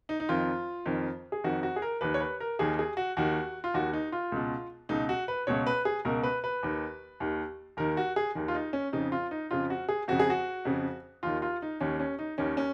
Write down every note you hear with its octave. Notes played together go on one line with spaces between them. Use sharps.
D#4
D#4
F2 D#3 F4
F2 D#3
G#4
F2 D#3 F#4
F#4
G#4
A#4
D#2 D#3 B4
C#5
B4
A#4
D#2 D#3 G#4
G#4
F#4
D#2 D#3 F#4
F4
D#2 D#3 F#4
D#4
F4
C#2 B2
C#2 B2 D#4
F#4
B4
C#2 B2 C#5
B4
G#4
C#2 B2 A#4
B4
B4
D#2 D#3
D#2 D#3
D#2 D#3 A#4
F#4
G#4
D#2 D#3
F4
D#4
C#4
F2 C#3 D#4
F4
D#4
F2 C#3 F4
F#4
G#4
F2 C#3 F#4
G#4
F#4
F2 C#3
D#2 D#3 F4
F4
D#4
D#2 D#3 C#4
C#4
D#4
D#2 D#3 C#4
C#4